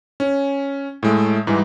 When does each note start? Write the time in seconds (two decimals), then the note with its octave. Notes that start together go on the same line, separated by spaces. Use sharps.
0.20 C#4
1.03 A2 G#3 A3
1.47 G#2 E3 G3 G#3